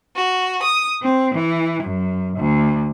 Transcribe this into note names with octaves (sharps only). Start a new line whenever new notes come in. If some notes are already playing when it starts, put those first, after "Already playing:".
F#4
D#6
C4
E3
F#2
D2